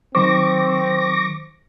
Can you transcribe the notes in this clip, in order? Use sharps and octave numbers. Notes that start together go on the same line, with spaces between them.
D#3 F#3 C4 C5 C#6 D6 A#6